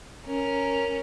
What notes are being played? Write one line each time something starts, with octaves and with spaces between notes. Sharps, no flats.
C#4 A#4